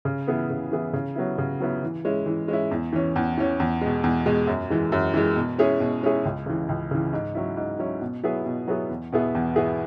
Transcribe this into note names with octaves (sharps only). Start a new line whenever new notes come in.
C#3
E3 B3 E4 G#4
C#3
E3 B3 E4 G#4
C#3
F#3 B3 E4
C#3
F#3 B3 E4
E3
G#3 C#4 E4
E3
G#3 C#4 E4
E2
E3 C#4
E2
E3 C#4
E2
B2 G#3
E2
B2 G#3
F#2
E3 G#3
F#2
E3 G#3
B2
G#3 C#4 E4 G#4
B2
G#3 C#4 E4 G#4
C#2
C#3 E3
C#2
C#3 E3
G#2
F#3 C#4 E4
G#2
F#3 C#4 E4
B2
F#3 B3 E4 G#4
B2
F#3 B3 E4 G#4
E2
B2 B3 E4 G#4
E2
B2 B3 E4 G#4